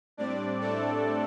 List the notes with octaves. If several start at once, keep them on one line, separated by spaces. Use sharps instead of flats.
A2 G3 C4 D4 D5
A3 A4